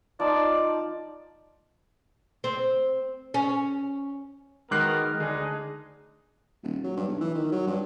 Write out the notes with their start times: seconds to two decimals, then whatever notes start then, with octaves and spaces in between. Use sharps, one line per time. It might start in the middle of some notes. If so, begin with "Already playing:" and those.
0.19 F3 D#4 D5
2.44 C4
3.34 C#4
4.71 D#3 G#3 B3 F#4 A#4 D6 F#6 C7
5.20 D2 G#3 D4 D#4 G#4
6.63 D#1
6.84 F#3
6.97 G2
7.08 B1
7.21 E3
7.35 D#3
7.52 F#3
7.67 G2